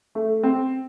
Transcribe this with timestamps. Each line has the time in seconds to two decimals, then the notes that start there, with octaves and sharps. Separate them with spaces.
0.15 A3
0.43 C4